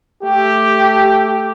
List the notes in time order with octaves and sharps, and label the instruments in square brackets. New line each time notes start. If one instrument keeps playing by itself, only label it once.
[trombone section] A3 G4